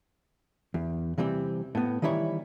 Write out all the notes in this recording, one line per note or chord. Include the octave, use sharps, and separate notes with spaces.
E2
C3 E3 G3 C4
A2 B3
D#3 E3 G3 E4 C#5